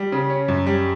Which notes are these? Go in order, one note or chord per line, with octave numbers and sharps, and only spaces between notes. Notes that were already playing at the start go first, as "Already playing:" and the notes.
Already playing: G3
C#3
C#4
F#2
G3